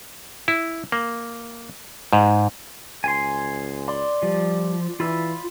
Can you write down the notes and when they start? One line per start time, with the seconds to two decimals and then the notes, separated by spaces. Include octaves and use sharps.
0.48 E4
0.92 A#3
2.13 G#2
3.04 C#2 G#5 C6
3.88 D5 C6
4.23 F3 G3
5.00 E3 F4 B5 E6